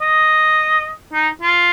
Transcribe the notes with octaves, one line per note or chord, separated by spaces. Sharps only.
D#5
D#4
F4